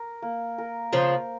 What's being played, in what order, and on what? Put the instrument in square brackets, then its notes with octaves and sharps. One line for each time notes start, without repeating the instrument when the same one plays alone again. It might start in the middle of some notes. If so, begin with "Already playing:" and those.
Already playing: [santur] A#4
A#3
A#4
[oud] C#3 F3 [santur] C5